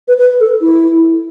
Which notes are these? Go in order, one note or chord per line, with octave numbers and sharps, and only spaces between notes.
B4
B4
A4
E4